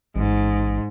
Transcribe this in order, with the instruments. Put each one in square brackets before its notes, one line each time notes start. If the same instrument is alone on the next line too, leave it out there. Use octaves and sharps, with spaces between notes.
[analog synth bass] A1 [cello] G#2